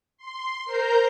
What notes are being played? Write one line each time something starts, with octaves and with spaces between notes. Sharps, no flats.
C6
A#4 C5 A#5 G6